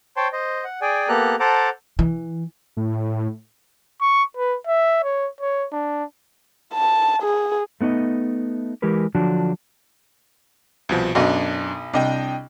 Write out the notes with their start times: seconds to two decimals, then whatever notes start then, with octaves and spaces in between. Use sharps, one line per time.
0.17 C5 C#5 G5 A5 C6
0.33 C5 D#5
0.64 F#5
0.81 G#4 D5 G5 G#5
1.09 A#3 B3 G4 A4 A#5 F#6
1.40 A4 C5 F#5 A5 A#5 D6
1.99 E3
2.77 A2
4.01 C#6
4.37 B4
4.67 E5
5.04 C#5
5.40 C#5
5.72 D4
6.74 A5
7.22 G#4
7.81 A3 B3 D#4 C#5 D#5
8.82 E3 G#3 G4 A#4 B4
9.15 D3 F3 F#3 D4 F#4
10.89 C2 B2 F3
11.15 B1 F#2 D4 D#5
11.94 C2 D4 D#5 G5